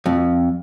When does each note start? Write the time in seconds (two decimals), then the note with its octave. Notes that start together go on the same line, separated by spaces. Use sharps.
0.06 F2